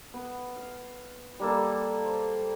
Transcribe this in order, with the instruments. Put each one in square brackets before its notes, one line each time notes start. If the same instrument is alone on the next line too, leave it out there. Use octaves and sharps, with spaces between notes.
[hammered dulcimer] B3
F5
G3 A#3 A4
C5